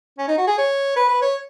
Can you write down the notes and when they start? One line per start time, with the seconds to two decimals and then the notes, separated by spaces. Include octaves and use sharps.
0.18 C#4
0.28 D#4
0.38 F#4
0.47 G#4
0.58 C#5
0.96 B4
1.09 B4
1.22 C#5